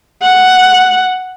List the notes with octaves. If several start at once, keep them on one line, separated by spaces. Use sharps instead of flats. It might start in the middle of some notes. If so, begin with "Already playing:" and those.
F#5